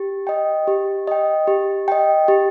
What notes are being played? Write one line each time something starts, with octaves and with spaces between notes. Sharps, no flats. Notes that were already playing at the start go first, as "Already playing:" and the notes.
Already playing: G4
D#5 G5
G4
D#5 G5
G4
D#5 G5
G4